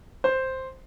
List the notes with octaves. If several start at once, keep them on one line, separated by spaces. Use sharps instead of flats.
C5